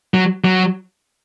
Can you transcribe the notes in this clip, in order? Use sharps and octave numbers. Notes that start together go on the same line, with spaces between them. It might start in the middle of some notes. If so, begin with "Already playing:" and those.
F#3
F#3